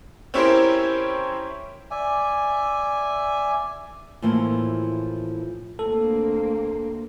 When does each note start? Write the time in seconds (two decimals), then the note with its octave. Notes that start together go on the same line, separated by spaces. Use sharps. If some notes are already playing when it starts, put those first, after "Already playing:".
0.34 C4 C#4 E4 G4 A#4 C5
1.91 D5 E5 G#5
4.22 A2 E3 F3 A#3
5.79 D2 A#3 C4 A4